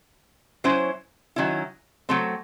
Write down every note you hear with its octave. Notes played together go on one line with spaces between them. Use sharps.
F#3 C#4 E4 C5
D#3 F#3 C#4 E4
F#3 A3 C4